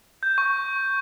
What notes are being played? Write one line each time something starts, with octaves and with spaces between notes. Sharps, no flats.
G6
C#6